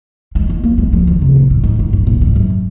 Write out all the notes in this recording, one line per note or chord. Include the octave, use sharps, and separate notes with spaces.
G#3
G#3
A#3
G#3
F3
D#3
C3
A#2
G#2
G#2
G#2
G#2
A#2
G#2
F#2